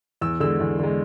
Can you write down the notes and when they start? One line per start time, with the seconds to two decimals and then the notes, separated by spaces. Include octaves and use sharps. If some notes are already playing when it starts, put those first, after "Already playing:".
0.21 E2 E6
0.40 D3 G#3 E6
0.60 E2
0.79 D3 G#3